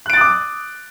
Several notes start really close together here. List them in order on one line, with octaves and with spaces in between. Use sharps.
F#6 D7 A6 D#6 D6